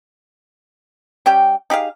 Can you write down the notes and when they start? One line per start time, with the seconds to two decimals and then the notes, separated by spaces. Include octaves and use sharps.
1.26 G3 C#4 G4 G5
1.70 D#4 G4 G#4 F5